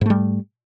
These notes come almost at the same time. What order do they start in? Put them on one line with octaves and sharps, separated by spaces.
G#2 A3 G3